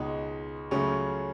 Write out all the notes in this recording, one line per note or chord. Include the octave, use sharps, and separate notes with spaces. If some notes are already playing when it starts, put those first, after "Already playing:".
Already playing: C#2 B2 G#3 D#4
C#2 C#3 F#3 A3 C#4